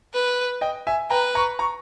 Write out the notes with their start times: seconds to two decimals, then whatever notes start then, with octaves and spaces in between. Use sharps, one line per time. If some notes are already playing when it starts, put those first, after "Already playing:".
0.14 B4
0.61 D#5 G5
0.87 E5 G#5
1.10 B4 G5 A#5
1.35 A#5 C#6
1.59 A#5 C#6